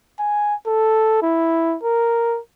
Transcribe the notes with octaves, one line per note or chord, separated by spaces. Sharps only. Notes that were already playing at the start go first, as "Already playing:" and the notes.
G#5
A4
E4
A#4